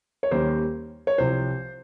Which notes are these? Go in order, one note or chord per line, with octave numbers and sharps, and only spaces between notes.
C#5
D#2 D#3 G3 A#3 C#4 C5
C#5
C2 C3 F3 C5